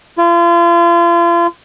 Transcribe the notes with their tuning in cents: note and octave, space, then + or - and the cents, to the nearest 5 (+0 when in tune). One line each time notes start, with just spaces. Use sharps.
F4 -35